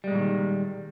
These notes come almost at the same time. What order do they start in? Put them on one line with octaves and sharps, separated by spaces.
G3 G#3 A#2 E3 D#3